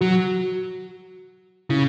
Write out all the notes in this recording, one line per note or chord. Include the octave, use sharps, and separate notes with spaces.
F#3 F#4
C#3 E4